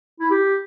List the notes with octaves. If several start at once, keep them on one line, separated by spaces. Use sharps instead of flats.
E4
G4